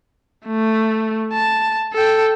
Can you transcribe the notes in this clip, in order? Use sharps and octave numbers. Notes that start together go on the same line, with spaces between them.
A3
A5
A4 G5